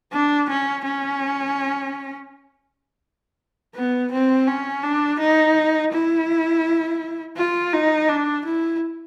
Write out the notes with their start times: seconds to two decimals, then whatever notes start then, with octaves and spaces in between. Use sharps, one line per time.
0.12 D4
0.49 C#4
0.85 C#4
3.75 B3
4.12 C4
4.47 C#4
4.83 D4
5.19 D#4
5.92 E4
7.37 F4
7.73 D#4
8.09 D4
8.45 E4